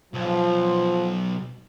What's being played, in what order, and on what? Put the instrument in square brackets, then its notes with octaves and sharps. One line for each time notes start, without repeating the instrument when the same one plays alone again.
[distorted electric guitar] B1 [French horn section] F3